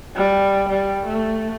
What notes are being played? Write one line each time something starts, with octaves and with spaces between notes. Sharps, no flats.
G3
G3
A3